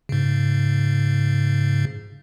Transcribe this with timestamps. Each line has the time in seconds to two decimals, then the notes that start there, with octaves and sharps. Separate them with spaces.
0.09 G#2 C#3